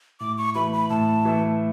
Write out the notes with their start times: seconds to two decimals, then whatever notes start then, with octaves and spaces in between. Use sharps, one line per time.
0.20 A2 D6
0.38 C#6
0.55 E3 A3 B5
0.73 B5
0.90 A2 A5
1.25 E3 A3